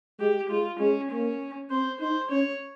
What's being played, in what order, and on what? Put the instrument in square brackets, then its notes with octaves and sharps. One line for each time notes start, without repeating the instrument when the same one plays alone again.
[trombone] G#3 [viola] G4
[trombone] G#3 [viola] F4
[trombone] G#3 [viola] C#4
[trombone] A#3 [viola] C#4
[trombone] C4 [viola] C5
[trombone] D#4 [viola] C5
[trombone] C#4 [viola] C#5